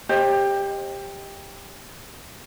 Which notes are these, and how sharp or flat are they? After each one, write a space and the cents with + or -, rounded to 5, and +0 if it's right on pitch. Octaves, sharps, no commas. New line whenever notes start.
G4 +15 C5 +40 D#5 +0